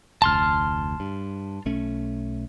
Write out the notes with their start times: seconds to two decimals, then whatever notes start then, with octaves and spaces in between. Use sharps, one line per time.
0.22 F1 D2 A5 C6 F6
1.00 G2
1.66 B1 A3 C#4